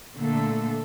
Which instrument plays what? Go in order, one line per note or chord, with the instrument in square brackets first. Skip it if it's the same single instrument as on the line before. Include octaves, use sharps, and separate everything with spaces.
[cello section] A#2 D3 A3 A4